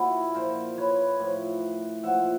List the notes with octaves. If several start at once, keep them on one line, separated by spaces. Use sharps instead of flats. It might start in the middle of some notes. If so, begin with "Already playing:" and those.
Already playing: A#2 F3 E4 F#4
A#2 F3 A#4 C5
B4 C#5
A2 F3
A#2 F3 E5 F#5